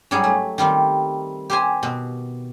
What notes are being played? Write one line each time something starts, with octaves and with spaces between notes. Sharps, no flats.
G#2 F#3 G3 G#4 C#5
A3
D#3 G3 C4
G4 C5 G#5
B2